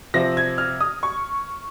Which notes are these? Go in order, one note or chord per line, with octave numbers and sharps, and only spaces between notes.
C3 F3 C4 A#6
G#6
F6
D#6
C#6